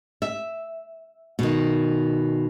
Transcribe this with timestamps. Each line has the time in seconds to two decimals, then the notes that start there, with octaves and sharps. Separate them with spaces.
0.22 E5
1.39 B2 D#3